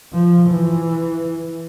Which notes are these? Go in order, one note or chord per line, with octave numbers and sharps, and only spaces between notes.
F3
E3